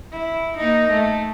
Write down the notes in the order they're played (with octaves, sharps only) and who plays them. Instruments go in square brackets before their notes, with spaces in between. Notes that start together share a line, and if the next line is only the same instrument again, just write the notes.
[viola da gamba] E4
A#3 D#4
A3